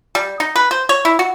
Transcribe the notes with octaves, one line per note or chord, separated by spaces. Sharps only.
G3
D#4
B4
C5
C#5
E4
F#4